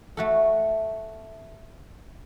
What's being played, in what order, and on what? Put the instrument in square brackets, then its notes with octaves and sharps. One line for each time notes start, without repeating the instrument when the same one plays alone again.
[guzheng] A3 F#4 A4